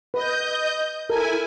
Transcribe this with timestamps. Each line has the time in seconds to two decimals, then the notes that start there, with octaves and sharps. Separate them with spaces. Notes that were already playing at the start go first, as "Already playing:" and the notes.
0.14 B4 D#5 G6
1.10 E4 A4 A#4 G#5